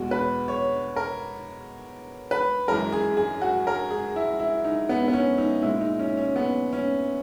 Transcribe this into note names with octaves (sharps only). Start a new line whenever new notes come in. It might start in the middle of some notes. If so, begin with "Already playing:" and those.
Already playing: E2 B2 G#3 F#4
B4
C#5
A#4
B4
F#2 E3 G#3 A#4
G#4
G#4
F#4
A#4
G#4
E4
E4
D#4
B3
B3
C#4
D#4
A#2 G#3 E4
D#4
C#4
C#4
B3
C#4